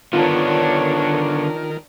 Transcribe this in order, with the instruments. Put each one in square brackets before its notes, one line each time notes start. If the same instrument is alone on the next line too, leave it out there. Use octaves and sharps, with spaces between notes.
[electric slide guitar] D3 B3 [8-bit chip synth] D#3 A#4 [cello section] D4 C#5 [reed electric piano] F4